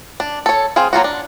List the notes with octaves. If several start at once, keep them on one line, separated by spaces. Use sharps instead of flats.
D4
A4 C#5
C4 G#4 F5
F#3 A#3 F4 F#4
D4